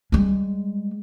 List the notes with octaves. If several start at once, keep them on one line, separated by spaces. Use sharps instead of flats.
G3 G#3